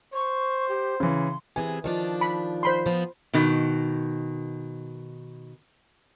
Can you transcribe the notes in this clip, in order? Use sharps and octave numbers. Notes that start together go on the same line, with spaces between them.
C5 C#6
G4
C#3 E3 C6
C3 E3 G#4 G#5
D#3 F3 D4
B5
C5 B5 C6
F3 B3
B2 D#3